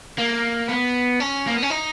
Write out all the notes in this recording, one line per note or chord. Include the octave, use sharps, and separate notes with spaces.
A#3
B3
C#4
A#3
B3
C#4
D#4